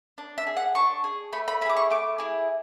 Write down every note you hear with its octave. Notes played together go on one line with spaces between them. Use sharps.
D4
E5
G#4
F#5
D4 C#6
G#4
A3 B5
B5
E4 G#4 B5 D6
C#6
A3 D6
E4 G#4